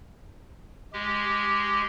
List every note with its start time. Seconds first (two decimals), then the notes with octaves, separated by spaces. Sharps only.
0.93 G#3 G4